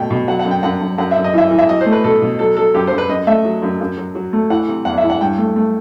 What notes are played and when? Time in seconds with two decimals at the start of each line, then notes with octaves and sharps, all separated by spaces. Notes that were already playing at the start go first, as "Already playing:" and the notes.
Already playing: B2 A3 G5
0.10 B2
0.28 F#3 F#5
0.39 F#5
0.45 F#2
0.51 G5
0.63 F#2 F#5
0.81 F#2
0.98 F#2 F#5
1.11 F#2 E5
1.24 D#5
1.34 E3 E5
1.51 E3
1.58 E5
1.69 F#3 D#5
1.81 C5
1.86 A3
1.92 B4
2.04 B2 A4
2.22 B2
2.39 F#3 A4
2.57 F#3 A4
2.74 F#2 G4
2.87 F#2 C5
2.98 B4
3.09 F#2 D#5
3.27 A3 E5
3.45 F#3
3.62 F#2
3.80 F#2
3.98 F#3
4.15 F#3
4.33 A3
4.50 E3 F#5
4.68 C3
4.85 E2 F#5
4.98 E5
5.03 E3
5.10 F#5
5.21 G2 G5
5.38 A3
5.56 A3